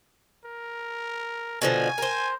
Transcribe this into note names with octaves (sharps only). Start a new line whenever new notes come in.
A#4
B2 D3 F3 G#5
A#4 C5